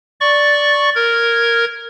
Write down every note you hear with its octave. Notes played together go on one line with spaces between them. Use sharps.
D5 C#6
A#4 G#6